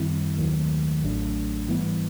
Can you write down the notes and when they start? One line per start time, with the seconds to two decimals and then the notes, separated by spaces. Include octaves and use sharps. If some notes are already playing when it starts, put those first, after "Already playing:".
Already playing: F#2 D#3 G3 C4 E4
0.37 D#2 D#3 F#3 A3
1.03 A1 A2 F#3 A3 D4
1.68 G#2 E3 G3 B3 E4